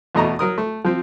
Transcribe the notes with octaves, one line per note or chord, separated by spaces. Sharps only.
E2 B2 A3 D#5 A#5
F#3 A#4 D#6
A3
F3 C4